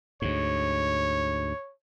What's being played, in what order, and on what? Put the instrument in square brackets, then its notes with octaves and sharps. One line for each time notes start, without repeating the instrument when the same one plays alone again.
[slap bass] D2 G#2 [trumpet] C#5